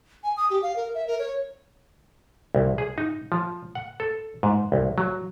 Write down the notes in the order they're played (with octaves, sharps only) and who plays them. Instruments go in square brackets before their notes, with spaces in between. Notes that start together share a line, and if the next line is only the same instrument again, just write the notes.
[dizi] G#5
D#6
G4
F5
A#4
E5
A#4
C#5
[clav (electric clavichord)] C2
G#4
D#4
F3
F#5
A4
G#2
C2
F#3